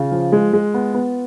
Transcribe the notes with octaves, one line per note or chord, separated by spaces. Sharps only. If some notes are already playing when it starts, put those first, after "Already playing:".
Already playing: C#3 F4
F3
G#3
G#3
B3
B3